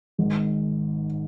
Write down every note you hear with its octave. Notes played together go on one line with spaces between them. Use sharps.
G#1 G#2 D#3